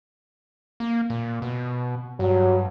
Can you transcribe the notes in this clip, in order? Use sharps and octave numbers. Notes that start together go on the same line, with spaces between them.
A#3
A#2
B2
G2 F#3